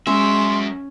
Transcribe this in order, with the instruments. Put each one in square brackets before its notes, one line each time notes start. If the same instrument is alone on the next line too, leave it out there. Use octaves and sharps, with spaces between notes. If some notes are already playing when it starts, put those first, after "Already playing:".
[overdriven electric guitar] F#2 E5 [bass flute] G#3 [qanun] C#4 [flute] C6